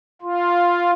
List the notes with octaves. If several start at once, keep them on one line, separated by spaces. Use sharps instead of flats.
F4